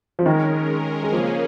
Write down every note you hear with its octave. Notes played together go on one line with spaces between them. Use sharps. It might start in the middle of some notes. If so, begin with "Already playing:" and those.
F3
D#3 G#3 C#4 A#4
G#3
C#3 F3 A#3 C#4 G#4